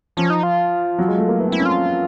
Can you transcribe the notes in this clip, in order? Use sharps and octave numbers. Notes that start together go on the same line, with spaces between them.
F3 C#4
D#4
F4
F#3
G#3
A3
A#3
B3 E4
C4 E4
C#4
F4